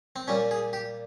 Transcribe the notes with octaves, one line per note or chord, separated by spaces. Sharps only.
C4
A#2 G3 C#4
G#4
G4